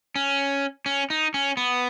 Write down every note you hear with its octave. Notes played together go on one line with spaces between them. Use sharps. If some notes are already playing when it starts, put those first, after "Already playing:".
C#4
C#4
D#4
C#4
B3